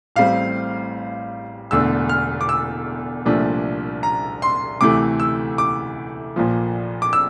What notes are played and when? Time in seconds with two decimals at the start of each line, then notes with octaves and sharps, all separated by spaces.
0.16 A1 A2 G3 C4 F5
1.71 E1 E2 D3 A3 D4 E6
2.09 F6
2.41 D6
2.49 E6
3.25 C2 A#2 F3 A3 D4
4.03 A#5
4.42 C6
4.81 D2 C3 E3 A3 D6
5.20 E6
5.58 D6
6.36 A#1 A#2 F3
7.02 D6
7.13 E6